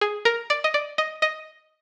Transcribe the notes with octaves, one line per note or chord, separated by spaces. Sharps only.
G#4
A#4
D5
D#5
D5
D#5
D#5